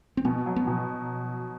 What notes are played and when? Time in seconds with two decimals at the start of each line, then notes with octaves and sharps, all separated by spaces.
0.17 C4
0.25 B2 B3
0.46 F#3
0.56 B3
0.67 B2